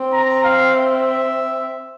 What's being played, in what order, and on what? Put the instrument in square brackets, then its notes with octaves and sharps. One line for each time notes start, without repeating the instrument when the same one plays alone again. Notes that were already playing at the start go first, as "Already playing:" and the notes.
Already playing: [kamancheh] C4
[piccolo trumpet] A#5
F5
E5